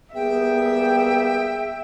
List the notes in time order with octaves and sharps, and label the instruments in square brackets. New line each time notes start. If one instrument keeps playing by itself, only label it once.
[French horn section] G3 A#3 B3 [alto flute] G#4 [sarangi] E5 [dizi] G5